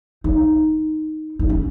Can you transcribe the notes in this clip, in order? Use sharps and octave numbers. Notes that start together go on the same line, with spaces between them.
D#4
D#4
C#4